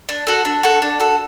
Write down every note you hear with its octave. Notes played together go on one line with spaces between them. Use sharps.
D4
F#4 A4
D4
F#4 A4
D4
F#4 A4